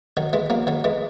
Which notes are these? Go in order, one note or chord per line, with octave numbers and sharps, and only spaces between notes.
D#3 F#3
E3 G#3
F#3 A#3
D#3 F#3
E3 G#3